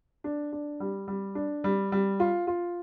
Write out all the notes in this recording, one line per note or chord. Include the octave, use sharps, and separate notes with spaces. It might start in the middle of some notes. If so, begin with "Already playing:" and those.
D4
D4
G3
G3
D4
G3
G3
F4
F4